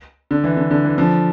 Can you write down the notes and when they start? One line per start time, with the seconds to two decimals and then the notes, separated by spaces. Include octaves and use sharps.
0.31 D3
0.44 E3
0.57 D3
0.71 D3
0.85 E3
0.98 D3 F3